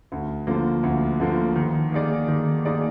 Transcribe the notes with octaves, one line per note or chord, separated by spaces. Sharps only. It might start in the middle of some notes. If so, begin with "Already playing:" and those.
D2
D3 F3 A#3
D2
D3 F3 A#3
D#3
A#3 D#4 G#4 D5
D#3
A#3 D#4 G#4 D5